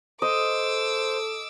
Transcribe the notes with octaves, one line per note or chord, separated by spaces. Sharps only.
A4 C5 D#5 D6 E6